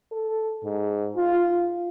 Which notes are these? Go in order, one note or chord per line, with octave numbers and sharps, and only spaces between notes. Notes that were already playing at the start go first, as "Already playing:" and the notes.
A4
G#2
F4